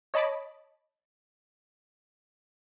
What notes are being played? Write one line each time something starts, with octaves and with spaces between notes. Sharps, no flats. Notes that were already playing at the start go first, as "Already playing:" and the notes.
C#5 D#5 A5 B5 D6